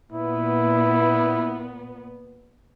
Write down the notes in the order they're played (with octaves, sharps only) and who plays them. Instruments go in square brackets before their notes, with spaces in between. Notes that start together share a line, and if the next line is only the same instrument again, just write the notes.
[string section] A#2 B3 [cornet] E4